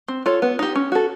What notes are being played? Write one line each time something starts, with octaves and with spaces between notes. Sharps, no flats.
C4
F4 A4 C#5
B3
D#4 G4
C#4
F#4 A4